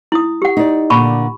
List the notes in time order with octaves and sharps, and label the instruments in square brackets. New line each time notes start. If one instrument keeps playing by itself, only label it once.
[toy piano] E4 D#6
G4 F#5
[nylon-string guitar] D#4 D5
[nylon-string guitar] A#2 D3 [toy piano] A5 B5 C#6